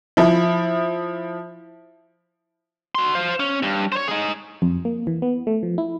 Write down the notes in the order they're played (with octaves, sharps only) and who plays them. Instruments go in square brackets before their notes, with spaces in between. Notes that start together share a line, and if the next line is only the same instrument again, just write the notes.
[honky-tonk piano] F3 E4
[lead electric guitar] F#4 C6
C5 F5
C#4
G2
C5 C#5
D#4 G#4
[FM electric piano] F2
A#3
E3
B3
A3
F3
E4